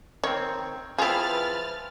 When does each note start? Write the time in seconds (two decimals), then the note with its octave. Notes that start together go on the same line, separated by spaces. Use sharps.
0.24 D#3 C4 C#5
0.98 F3 C4 E4 G#4 B4 F6 A6